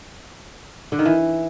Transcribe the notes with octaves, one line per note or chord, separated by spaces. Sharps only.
D3
D#3
E3